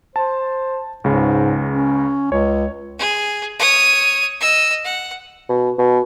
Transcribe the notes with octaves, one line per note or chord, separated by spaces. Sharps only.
C5 A5
C#2 G#2 C#3
C#4
C#2 C#5
G#4
C#5 D#6
D#5 E6
F#5
B2
B2